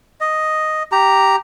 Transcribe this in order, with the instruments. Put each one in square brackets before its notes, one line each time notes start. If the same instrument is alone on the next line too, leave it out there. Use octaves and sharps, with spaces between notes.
[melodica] D#5
G4 A#5